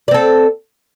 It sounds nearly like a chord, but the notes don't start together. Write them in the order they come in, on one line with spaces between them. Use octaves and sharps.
D5 C4 A4